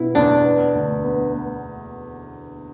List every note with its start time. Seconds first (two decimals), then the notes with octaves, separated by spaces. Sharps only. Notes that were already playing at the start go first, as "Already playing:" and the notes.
Already playing: B2 B3 E4
0.15 E2 D4
0.45 B3
0.75 D2
1.04 B3
1.34 B3